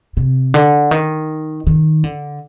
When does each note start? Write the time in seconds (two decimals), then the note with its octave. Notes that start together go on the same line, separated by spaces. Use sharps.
0.17 C3
0.54 D3
0.91 D#3
1.67 D#3
2.04 D3